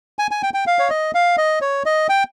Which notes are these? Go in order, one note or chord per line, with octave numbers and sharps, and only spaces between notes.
G#5
G#5
G5
G5
F5
C#5
D#5
F5
D#5
C#5
D#5
G5